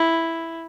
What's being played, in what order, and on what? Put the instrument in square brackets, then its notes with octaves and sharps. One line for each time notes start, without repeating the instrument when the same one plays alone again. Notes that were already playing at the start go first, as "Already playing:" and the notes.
Already playing: [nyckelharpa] E4